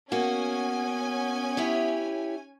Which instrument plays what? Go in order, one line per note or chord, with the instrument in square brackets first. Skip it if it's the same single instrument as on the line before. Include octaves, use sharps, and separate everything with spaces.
[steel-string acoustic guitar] A#3 F#4 [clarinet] B3 [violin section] C#4 G#5
[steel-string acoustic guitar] E4 G4 C#5